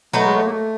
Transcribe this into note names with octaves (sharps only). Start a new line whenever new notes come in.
F#3 A3 B3 D#4
G#3
A3
A#3
A3